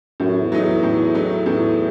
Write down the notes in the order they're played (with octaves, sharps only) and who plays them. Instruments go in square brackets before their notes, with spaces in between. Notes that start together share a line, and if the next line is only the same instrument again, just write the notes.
[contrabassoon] F#2 [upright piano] A2
[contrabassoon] E2
[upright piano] F#3 A3 D#4
[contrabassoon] E2
[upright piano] A2
F#3 A3 D#4
[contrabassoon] E2 [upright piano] A2